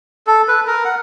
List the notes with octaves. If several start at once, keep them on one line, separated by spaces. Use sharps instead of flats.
A4
B4
A#4
F#5